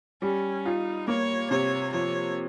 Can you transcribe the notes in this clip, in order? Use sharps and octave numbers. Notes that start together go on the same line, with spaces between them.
G3 C#4
D#4 F4
A#3 C#5
C3 C#5
F3 C#5